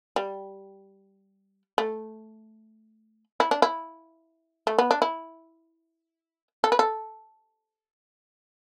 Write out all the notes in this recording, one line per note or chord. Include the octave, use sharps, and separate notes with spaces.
G3
A3
E4
D4
E4
A3
B3
D4
E4
A4
B4
A4